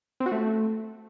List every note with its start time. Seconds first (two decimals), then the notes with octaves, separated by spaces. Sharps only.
0.20 C4
0.26 F#4
0.32 A3